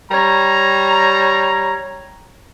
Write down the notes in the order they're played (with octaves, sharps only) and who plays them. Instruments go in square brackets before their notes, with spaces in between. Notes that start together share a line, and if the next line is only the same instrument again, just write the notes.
[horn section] G3 C#5 A#5